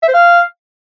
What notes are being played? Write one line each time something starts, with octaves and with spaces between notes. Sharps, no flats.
E5
C5
F5